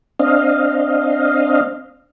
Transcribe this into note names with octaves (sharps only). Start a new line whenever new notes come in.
C4 D4 D#5 F5